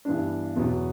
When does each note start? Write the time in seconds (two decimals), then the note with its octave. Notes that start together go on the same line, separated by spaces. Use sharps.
0.05 G2 E3 B3 D4
0.56 E2 B2 F#3 B3